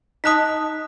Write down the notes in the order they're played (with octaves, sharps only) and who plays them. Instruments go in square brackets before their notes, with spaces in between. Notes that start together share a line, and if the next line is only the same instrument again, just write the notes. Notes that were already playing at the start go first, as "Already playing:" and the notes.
[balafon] D#4 D#5 A5 [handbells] D#6 F#6 B6